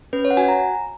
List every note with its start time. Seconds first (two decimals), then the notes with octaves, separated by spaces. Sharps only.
0.13 C#4 B4
0.25 C#5
0.31 F#5
0.37 F#4 G#5
0.48 A#5